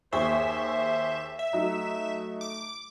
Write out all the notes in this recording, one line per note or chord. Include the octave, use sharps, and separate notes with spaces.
D#2 G#4 C5 E5 C#6
E5
F#3 A3 D#4
D6